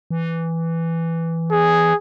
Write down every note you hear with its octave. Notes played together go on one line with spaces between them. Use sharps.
E3
G#4